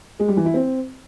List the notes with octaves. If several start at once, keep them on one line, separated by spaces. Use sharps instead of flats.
G#3
G3
E3
E4
C4